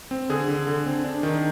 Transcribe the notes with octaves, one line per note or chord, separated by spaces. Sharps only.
C4
D3 G#4
D3
D3
C4
D4
D#3